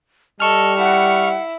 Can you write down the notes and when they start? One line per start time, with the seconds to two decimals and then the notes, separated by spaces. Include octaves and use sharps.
0.40 G3 A4 D#5 C#6 F6
0.78 E4 F#5